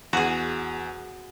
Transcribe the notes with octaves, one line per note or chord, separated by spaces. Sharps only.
E2 F#4 G#4